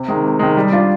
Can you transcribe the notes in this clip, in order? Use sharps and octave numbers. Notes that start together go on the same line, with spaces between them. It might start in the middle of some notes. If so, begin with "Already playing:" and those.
Already playing: C3
D#3 G#3
C3
D#3 G#3
G3
D4 F4